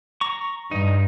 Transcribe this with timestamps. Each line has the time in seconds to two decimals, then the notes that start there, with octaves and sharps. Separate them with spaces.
0.21 A#5 C#6
0.71 G2 D#4